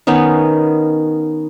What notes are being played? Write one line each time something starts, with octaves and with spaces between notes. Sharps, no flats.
D#3 B3 C#4 D#4